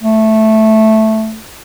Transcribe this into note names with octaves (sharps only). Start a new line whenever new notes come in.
A3